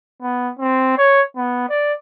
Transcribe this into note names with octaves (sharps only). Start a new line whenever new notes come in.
B3
C4
C#5
B3
D5